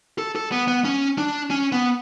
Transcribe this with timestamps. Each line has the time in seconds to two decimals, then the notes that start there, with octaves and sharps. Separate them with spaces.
0.18 A4
0.36 A4
0.52 B3
0.68 B3
0.85 C#4
1.18 D4
1.50 C#4
1.72 B3